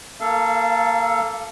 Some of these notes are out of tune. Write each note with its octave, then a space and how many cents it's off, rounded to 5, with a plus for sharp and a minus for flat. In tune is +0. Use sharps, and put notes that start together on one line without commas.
A#3 +0 A4 +0 F5 -30